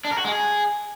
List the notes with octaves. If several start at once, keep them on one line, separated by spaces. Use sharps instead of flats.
D4
A#4
F#4
G#3
G#4